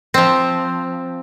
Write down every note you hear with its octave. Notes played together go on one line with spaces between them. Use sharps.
F3 C4